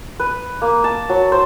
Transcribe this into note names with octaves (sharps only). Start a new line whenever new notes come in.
B4
A#3
A5
F#3
C5